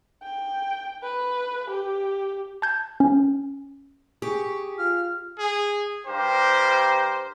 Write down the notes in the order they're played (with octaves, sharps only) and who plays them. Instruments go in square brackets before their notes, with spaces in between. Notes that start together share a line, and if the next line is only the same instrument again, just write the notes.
[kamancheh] G5
B4
G4
[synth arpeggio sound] A5 G6 G#6
C#4
[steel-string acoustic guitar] G4 [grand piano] G#4 [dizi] C#6
[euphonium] F4 [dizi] F6
[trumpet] G#4
[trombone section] G2 G4 A#4 [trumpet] C5